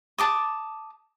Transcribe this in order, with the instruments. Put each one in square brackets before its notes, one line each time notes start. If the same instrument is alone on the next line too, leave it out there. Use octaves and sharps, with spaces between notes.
[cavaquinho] A5 D6 D#6